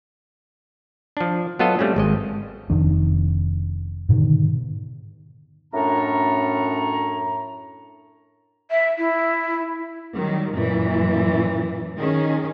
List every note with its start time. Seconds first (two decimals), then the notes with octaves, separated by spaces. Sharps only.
1.17 F3 D4
1.59 F#3 B3 F4 A4 D#5
1.79 G3 A3 C4 C#4
1.96 G#1 G#3 D#5
2.70 F1 F2 D#3 D4
4.09 G#2 B2 D3 D#3
5.73 F#2 A2 C#4 D4 C#5 A#5
8.71 E5
8.98 E4
10.14 D#3 F#3 G3
10.55 F#2 A#2 E3
11.99 D#3 C#4 G#4